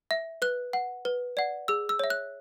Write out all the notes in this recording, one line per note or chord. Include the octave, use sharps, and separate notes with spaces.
E5
B4 F#6
F#5
B4
D5 F#5
G#4 E6
E6
C#5 E5
F#6